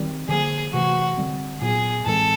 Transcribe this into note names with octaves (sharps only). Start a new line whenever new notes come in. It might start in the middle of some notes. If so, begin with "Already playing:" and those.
Already playing: D#3 G3 C4
D3 F3 A#3 G#4
C3 E3 A3 F#4
D3 G3 C4
A#2 F#3 B3 G#4
A2 E3 G#3 C4 A4